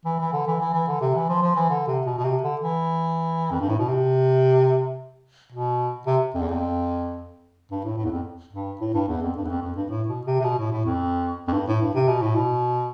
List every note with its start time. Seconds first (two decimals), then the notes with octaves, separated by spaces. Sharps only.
0.05 E3
0.19 E3
0.33 D3
0.47 E3
0.60 E3
0.73 E3
0.87 D3
1.01 C3
1.15 E3
1.29 F3
1.42 F3
1.56 E3
1.70 D3
1.87 C3
2.06 B2
2.18 B2
2.24 C3
2.42 D3
2.61 E3
3.51 F2
3.60 G2
3.69 A2
3.79 B2
3.88 C3
5.52 B2
6.07 C3
6.34 F2
6.41 E2
6.48 F2
7.71 G2
7.84 A2
7.98 A2
8.05 E2
8.11 F2
8.53 G2
8.81 A2
8.94 G2
9.08 E2
9.22 F2
9.35 G2
9.45 E2
9.49 F2
9.62 F2
9.76 G2
9.89 A2
10.08 B2
10.26 C3
10.40 C3
10.44 B2
10.58 A2
10.72 A2
10.85 F2
11.48 F2
11.53 G2
11.67 A2
11.81 G2
11.95 C3
12.08 B2
12.22 A2
12.35 B2